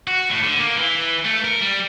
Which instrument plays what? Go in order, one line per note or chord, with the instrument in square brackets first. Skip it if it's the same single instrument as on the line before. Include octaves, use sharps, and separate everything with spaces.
[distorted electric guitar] F#4
A2
D3
A#3
E3
A3
A#4
G3